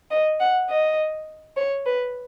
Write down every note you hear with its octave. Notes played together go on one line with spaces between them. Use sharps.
D#5
F#5
D#5
C#5
B4